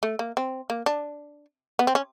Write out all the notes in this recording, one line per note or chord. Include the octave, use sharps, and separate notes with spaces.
A3
A#3
C4
A#3
D4
B3
C4
C#4